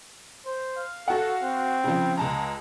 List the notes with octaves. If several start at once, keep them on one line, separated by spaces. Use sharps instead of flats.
C5
F5
F#4 A4 F#5
C4
C#3 F3
C#2 G#3 A5 A#5